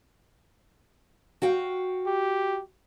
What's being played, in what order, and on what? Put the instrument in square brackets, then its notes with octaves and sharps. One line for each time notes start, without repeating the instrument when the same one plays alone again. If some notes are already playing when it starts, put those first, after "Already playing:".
[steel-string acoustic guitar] F#4 F5 G5
[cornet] G4